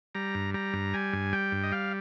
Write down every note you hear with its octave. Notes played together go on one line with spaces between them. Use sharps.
G3 A#5
G2
G3 A#5
G2
G3 G#5
G2
G3 G5
G2
D#5
G3 F5